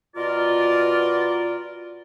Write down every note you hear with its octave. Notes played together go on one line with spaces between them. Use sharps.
B2 F4 A#4 D5